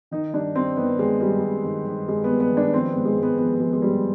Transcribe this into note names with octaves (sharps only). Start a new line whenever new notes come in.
D#3 D#4
G2 D4
G2 C4
D#3 B3
D#3 G#3
G2 G3
G2
D#3
D#3
G2 G#3
B3
G2
B3
D#3
D4
F3 C4
B3
G#2
G#3
G#2
B3
F3 B3
B3
F3 G#3
G#3
G#2 G3